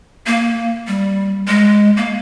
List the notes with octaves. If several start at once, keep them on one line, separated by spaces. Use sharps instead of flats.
A#3
G3
G#3
A#3